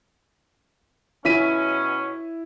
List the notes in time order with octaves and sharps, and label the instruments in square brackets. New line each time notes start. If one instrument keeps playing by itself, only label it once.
[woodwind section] B2 F#3 C#4 [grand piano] E4 B6 D#7